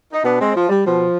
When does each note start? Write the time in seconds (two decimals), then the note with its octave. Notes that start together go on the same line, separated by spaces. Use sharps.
0.12 D#4
0.23 B2 B3 D4
0.39 G#3 C4
0.55 F3
0.69 G3
0.84 B2 F3